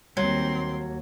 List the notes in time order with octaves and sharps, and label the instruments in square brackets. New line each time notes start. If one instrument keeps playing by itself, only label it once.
[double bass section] D#2 [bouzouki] F#3 [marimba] G3 [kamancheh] C4 C6